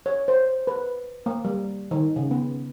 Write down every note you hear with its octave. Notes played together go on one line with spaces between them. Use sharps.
C#5
C5
B4
A#3
G3
D#3
C#3
B3